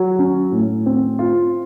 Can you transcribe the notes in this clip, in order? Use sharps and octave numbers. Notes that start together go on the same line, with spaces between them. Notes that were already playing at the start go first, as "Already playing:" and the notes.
Already playing: F#3
C#4
A2
C4
F4